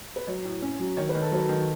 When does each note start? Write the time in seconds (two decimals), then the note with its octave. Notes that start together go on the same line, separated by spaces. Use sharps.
0.16 B4
0.27 F#3 C#5
0.45 A2
0.62 C#4
0.80 F#3
0.97 D#3 C#5
1.09 B4
1.15 D#3
1.22 A4
1.32 F#3 B4
1.49 D#3